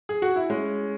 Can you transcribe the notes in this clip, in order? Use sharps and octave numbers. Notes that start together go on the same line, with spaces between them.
G#4
F#4
E4
G#3 C#4